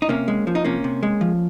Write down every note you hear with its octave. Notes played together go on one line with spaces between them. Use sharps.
D#4
C3 A#3 C#4
G#3
F3
D#4
C3 A#3 C#4
C3
G#3
F3